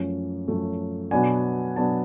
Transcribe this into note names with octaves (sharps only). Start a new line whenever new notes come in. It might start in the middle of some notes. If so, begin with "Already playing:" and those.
Already playing: F#2 F3 A3 C#4
F#2 F3 A3 C#4
B2 F#3 B3 D4 G#5
B2 F#3 B3 D4 A5